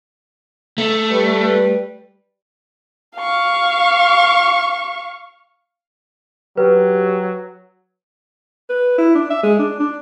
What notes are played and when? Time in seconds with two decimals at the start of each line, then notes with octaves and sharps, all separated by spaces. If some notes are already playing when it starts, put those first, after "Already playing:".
0.78 A3
1.11 G3 B4
3.16 F5 C#6
6.57 F#3 G4 B4
8.69 B4
8.98 E4
9.15 D4
9.30 E5
9.43 G#3
9.59 D4
9.80 D4